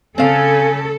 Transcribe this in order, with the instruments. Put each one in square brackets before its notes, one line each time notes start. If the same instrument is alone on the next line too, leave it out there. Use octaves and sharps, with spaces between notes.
[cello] C#3 [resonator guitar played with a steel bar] C4 F5 [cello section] A4 [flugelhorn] G#5